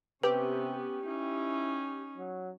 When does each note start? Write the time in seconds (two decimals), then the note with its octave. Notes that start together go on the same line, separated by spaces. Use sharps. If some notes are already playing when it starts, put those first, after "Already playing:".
0.23 C3 B3 C#4 G4 B4
1.06 C#4 D#4 E4
2.17 F#3